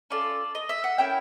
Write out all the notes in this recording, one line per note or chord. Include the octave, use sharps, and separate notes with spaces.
C#4 F4 A4 D5
D#5
E5
F#5
A#3 C#4 E4 G5